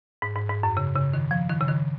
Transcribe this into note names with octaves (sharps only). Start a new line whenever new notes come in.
G#2
G#2
G#2
F#2
C#3
C#3
D#3
F3
D#3
C#3
D#3